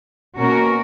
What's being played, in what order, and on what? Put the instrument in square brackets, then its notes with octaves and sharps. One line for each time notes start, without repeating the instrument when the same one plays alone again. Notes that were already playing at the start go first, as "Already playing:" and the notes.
[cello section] B2 A#3 C#4 F#4 A#4